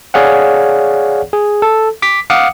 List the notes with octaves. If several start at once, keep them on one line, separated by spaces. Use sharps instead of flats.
G#4 C#5 D5 F5 F#5
G#4
A4
D6 B6
F5 F#5 D6 D#6 C#7